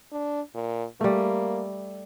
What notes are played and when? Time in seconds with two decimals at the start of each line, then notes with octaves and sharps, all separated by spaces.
0.12 D4
0.55 A#2
1.01 G3 A3 A#3